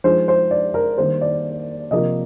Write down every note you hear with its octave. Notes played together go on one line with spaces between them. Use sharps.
F3 G#3 D#4 C5
C5
D5
A#4
D#3 G3 A#3 C5
D5
C3 F3 A#3 D#5